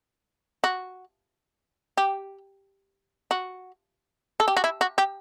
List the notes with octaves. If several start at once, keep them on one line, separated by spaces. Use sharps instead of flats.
F#4
G4
F#4
A4
G4
F#4
E4
F#4
G4